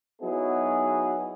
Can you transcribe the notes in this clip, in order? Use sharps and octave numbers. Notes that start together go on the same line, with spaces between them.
F#3 B3 D#4 E4 F#4 G#4